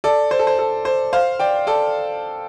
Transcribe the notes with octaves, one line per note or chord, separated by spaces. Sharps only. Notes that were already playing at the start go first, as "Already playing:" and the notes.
A4 D5
C5
A4
C5
A4
C5
C5 F5
D5 G5
A4 D5